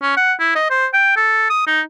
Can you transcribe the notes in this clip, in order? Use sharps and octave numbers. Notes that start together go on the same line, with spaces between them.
C#4
F#5
E4
D#5
C5
G5
A4
D#6
D#4